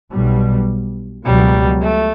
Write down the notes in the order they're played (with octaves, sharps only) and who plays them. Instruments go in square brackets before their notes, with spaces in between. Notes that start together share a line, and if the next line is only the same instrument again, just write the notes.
[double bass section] B1 B2 G3
[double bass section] C#2 B2 F#3 [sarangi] G3
[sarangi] A3